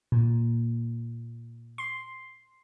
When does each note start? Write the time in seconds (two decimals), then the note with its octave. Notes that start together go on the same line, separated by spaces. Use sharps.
0.12 A#2
1.78 C6